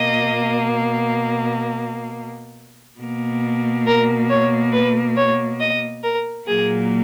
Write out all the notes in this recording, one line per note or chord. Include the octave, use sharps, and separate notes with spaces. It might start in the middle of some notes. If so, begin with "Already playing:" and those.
Already playing: B2 A#3 D#5
B2 A#3
A#4
C#5
B4
C#5
D#5
A#4
A#2 F#3 A#3 G#4